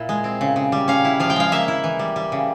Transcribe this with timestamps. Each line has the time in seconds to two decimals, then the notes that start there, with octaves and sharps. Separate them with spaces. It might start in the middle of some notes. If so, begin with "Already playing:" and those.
Already playing: A#2 E4
0.09 G#3
0.24 C4
0.41 C#3
0.56 C#3
0.72 G3
0.88 C#4 F5
1.05 E4
1.20 F3 F5
1.30 G5
1.36 G#3 F5
1.52 A#3 E5
1.68 E4
1.84 E3
1.99 G3
2.16 G3
2.32 C#3